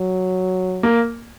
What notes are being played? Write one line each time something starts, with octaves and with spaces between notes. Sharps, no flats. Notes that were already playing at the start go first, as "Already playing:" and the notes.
Already playing: F#3
A#3